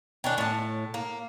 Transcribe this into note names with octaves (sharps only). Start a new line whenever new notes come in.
D#3 C#4 D4
A2 A5
A#3